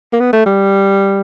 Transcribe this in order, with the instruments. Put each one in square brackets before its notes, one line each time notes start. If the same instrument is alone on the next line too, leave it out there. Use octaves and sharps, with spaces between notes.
[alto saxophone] A#3
B3
A3
G3